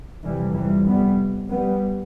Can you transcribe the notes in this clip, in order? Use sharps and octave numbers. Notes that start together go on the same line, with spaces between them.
F2 C3 E3 G3
E3 G3
G3 B3
G3 B3